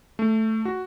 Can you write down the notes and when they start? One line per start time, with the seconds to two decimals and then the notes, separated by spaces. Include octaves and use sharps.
0.19 A3
0.65 F#4